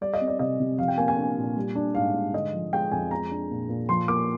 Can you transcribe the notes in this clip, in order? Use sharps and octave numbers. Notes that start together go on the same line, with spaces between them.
G3 D5
D#5
C4
D5
C3 D#5
C3
F3 F5
G5
A#3 G#5
G#5
D4
A#2
G3
D4
G#2 F5
G#2
D3 D#5
F3
G#3 G5
F2 G#5
G#3 A#5
D4
A#2
A#2
F3 C6
A#3 D6